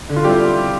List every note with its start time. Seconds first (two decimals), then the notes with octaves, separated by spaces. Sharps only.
0.09 D3
0.16 F4
0.24 G3 C4 E4 G4